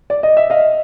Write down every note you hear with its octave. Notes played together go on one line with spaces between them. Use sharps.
D5
D#5
E5
D#5 F5